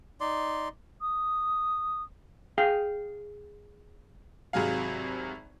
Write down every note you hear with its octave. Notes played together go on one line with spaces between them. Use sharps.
D#4 D5 C6
D#6
G#4 F5 G5
G#1 C3 F#3 G#4 F5